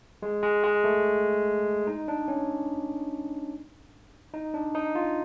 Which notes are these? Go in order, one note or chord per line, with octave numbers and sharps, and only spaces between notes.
G#3
G#3
G#3
A3
D#4
D4
C#4
D#4
D4
D#4
F4